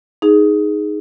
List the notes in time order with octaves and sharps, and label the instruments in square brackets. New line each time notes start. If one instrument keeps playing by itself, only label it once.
[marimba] D#4 G#4